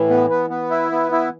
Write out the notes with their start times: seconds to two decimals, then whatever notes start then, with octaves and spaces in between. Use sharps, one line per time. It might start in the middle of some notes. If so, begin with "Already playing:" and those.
Already playing: A2 E3
0.09 B3
0.30 B3
0.50 B3
0.71 E4
0.92 B3
1.12 E4